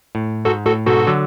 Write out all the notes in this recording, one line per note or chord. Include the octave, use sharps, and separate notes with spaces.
A2
G#2 F#4 A4
A2 F#4 A4
G#2 B2 F#4 A4
D3 F#3